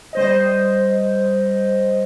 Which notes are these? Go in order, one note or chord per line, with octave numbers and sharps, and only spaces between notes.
G3 C5 D#5